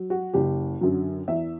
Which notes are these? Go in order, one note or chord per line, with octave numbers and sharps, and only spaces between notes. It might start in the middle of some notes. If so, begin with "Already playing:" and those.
Already playing: F#3
F#4
F#1 G4
F#2 D3 F#3
E2 E5